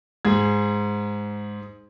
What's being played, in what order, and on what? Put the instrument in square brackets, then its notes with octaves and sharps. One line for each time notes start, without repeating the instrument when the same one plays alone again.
[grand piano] G#2 G#4 G#6